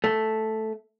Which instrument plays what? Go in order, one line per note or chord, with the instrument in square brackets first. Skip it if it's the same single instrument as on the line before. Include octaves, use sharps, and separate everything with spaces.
[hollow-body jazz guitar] A3